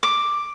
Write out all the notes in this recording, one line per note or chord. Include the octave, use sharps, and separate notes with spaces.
D6